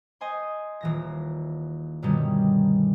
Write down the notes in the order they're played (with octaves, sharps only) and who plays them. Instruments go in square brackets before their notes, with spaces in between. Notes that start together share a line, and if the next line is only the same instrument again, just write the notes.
[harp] C5 D#5 G#5 C6
D#1 E3 A#6
G2 B2 D3 D#3 G3 C#4